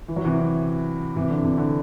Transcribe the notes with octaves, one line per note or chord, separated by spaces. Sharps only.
E3
F#3
C3 E3
C3 E3
D3
C3
D3